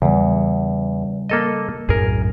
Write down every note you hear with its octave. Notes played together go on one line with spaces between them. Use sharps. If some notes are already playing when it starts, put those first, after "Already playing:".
E2 C#3 G3
A#3 A4 D#5
B1 F#2 A2 G#4 A#4